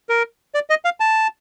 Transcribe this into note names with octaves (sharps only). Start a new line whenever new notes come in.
A#4
D5
D#5
F5
A5